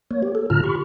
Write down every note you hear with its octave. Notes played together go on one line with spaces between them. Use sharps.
A#3 C#5
G4
A4
A2 D3 F4 A5 A#5 F6
G4 B5 C#6